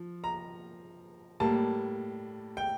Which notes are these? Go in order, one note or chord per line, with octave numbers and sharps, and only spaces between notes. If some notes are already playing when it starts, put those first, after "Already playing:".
Already playing: F3
A#5
A2 G3 A#3 A5
G5